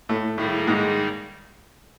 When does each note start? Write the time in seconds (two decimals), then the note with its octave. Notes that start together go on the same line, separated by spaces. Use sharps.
0.09 A2 A3
0.38 A2 D#3 G3 A3 A#3 D#4 G#4
0.67 G#2 G#3